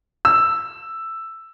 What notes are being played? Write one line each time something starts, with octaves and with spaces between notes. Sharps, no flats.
E6